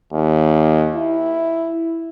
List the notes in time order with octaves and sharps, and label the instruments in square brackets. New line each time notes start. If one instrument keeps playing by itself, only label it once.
[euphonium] D#2
E4